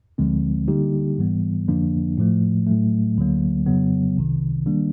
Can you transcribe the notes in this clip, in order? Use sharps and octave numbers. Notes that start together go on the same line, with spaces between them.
D2 D3 F3 G#3 C4
D3 G3 A#3 D#4 G4
G#2 E3 G3 B3
F2 D3 F3 A#3 D4
A2 F3 A3
A2 F#3 A3
D2 D3 F#3 A#3
F2 C#3 F#3 B3
C2 C3 D#3
D#3 G3 A#3 D4